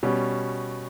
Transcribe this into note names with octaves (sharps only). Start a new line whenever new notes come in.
B2 G3 C#4